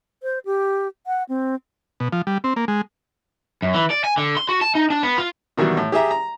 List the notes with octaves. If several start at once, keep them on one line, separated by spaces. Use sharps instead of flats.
C5
G4
F#5
C4
B2
F3
G3
C4
A#3
G#3
F#2
E3
D5
G#5
D3
C6
F#4
A5
D#4
D4
B3
F4
B2 D#3 E3 F#3 G3
A2
G4 G#4 E5 A#5
A#5